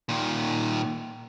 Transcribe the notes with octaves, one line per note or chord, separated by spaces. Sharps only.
A#2 D#3